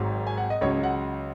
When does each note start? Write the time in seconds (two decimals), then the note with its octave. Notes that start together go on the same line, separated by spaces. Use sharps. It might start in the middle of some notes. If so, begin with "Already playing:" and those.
Already playing: G#1 G#2 F#3
0.27 G#5
0.38 F#5
0.50 D#5
0.61 C#2 C#3 F#3 C#5
0.83 F#5